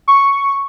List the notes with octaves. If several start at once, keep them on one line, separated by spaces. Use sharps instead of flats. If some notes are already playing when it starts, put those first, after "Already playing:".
C#6